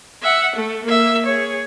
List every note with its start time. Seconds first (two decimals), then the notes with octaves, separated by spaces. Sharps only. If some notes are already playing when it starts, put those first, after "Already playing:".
0.23 E5 F#5
0.56 A3
0.84 A#3 E5
1.26 G#4 C#5